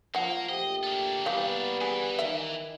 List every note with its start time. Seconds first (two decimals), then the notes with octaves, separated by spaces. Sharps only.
0.15 F3 A#3 F5 F#5
0.49 A#1 A3 G4 D#5
0.83 A#3 A4
1.26 E3 G3 B3 G4 F5
1.81 E3 G#4
2.19 D#3 E5